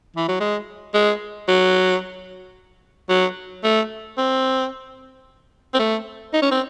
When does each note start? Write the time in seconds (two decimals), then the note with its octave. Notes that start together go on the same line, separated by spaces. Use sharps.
0.16 E3
0.28 F#3
0.40 G#3
0.94 G#3
1.48 F#3
3.09 F#3
3.64 A3
4.17 C4
5.74 C4
5.79 A3
6.33 D#4
6.42 C#4
6.51 C4